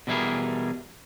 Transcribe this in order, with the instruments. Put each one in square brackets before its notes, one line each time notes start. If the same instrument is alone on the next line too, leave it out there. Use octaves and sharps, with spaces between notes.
[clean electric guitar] B2 E3 G3 E4 G#4 A#4